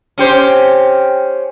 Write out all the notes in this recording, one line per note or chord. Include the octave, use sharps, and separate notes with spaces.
C#4 G4 C5